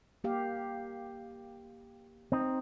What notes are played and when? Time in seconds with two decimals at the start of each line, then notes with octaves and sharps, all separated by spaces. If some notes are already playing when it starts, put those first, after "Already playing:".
0.24 A#3 G4 F5
2.32 C4 D#4